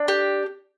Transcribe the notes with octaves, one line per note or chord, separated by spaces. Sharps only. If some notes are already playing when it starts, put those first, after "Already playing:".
Already playing: D4
G4